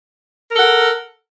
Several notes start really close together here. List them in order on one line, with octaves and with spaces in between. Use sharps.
A#4 A4 F#5